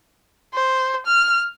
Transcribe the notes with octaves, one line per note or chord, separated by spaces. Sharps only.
C5
F6